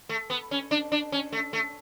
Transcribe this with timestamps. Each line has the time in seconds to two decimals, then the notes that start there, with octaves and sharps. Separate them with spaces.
0.09 A3
0.30 B3
0.51 C#4
0.71 D4
0.92 D4
1.12 C#4
1.32 A3
1.53 A3